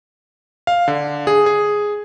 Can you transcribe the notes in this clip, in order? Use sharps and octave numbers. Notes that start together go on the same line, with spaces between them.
F5
D3
G#4
G#4